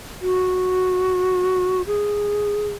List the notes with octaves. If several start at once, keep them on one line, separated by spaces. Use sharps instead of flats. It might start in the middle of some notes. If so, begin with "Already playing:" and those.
F#4
G#4